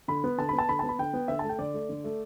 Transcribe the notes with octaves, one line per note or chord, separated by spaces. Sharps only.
D3 B5
B3
D3 A5
B3 B5
A5
D3 B5
B3 A5
B5
D3 G5
B3
D3 E5
A3 A5
G5
D3 D5
A3
D3
A3